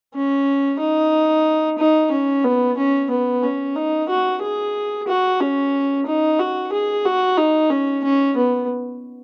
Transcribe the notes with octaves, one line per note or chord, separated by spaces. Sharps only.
C#4
D#4
D#4
C#4
B3
C#4
B3
C#4
D#4
F#4
G#4
F#4
C#4
D#4
F#4
G#4
F#4
D#4
C#4
C#4
B3